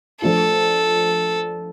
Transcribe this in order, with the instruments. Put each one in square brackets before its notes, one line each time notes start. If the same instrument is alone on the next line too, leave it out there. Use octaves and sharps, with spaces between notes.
[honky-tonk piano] F3 A3 D4 F4 [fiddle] A4